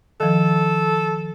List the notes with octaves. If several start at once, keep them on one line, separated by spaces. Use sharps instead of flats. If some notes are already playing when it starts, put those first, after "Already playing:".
D#3 F3 A4